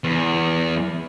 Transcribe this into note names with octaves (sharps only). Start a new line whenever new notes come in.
E2